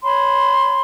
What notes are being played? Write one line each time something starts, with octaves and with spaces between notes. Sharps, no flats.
C#5 B5 C6